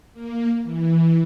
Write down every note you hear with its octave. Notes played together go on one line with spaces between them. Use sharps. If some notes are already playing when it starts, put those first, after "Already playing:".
A#3
E3